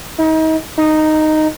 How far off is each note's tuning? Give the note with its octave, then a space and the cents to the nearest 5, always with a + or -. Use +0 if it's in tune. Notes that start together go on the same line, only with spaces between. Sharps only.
D#4 +35
D#4 -5